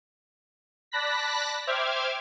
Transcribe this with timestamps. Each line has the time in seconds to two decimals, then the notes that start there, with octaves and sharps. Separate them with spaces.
0.92 D5 A5 B5 F#6 A#6 B6
1.67 C5 E5 G5 D6 F6 G#6